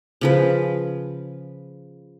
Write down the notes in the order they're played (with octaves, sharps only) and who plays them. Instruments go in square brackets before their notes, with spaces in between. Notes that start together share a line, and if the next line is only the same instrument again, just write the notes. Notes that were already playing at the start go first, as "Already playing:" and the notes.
[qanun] C#3 F3 B4